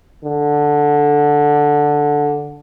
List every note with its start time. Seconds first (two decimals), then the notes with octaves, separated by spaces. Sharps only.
0.25 D3